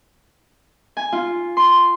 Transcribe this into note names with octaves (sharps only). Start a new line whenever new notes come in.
G#5
F4
C6